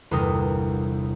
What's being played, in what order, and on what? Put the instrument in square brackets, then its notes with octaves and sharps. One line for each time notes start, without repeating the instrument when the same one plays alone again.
[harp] G1 E2 C3 A#4 G5 D#6